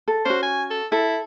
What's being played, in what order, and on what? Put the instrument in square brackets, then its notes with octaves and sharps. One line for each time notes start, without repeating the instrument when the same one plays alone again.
[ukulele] A4
[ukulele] C#4 F#4 [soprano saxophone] C5
[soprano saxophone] G#5
A4
[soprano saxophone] E4 [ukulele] A4